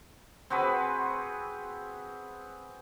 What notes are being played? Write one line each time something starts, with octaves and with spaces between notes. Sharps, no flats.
C4 F#4 G#4 B4